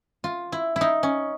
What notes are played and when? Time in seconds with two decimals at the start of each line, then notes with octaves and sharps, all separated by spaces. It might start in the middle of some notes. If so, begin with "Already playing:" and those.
0.24 F4
0.52 E4
0.76 E4
0.81 D#4
1.03 C#4